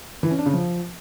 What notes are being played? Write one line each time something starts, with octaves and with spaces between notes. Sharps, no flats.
E3
C#4
D4
C#3
F3